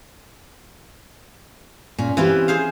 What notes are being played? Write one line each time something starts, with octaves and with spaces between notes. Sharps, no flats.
A#2 C#4
E3 C4 F4 G4 B4
G#4 C5 F5